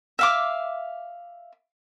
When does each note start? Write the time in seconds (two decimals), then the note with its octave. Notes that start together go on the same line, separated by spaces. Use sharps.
0.19 E5 F5 D6